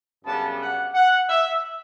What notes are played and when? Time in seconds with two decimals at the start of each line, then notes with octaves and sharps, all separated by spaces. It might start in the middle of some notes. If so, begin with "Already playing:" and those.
0.24 F#2 C#3 G3 B3 D4 A5
0.60 F#5
0.94 F#5
1.29 E5